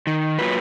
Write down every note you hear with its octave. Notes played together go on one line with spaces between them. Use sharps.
D#3
F#3 A#3 F4 B4